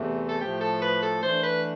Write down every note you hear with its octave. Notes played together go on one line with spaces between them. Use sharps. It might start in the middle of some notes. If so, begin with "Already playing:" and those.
Already playing: E2 C3 E3 A3
A4
A2 F3 A3 G4
A4
B4
A4
E3 A3 D4 C5
B4